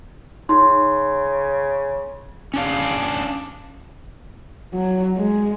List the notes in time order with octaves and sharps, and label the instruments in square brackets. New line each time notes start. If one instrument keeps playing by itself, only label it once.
[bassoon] C#3 [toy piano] D#4 [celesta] C6
[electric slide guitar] C#4 D4 F5
[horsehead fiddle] F#3
G#3